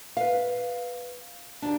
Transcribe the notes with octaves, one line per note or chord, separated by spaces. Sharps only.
B4 F5
D#2 D4